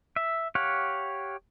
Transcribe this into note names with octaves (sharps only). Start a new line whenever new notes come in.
E5
G4 C#5 F5 F#5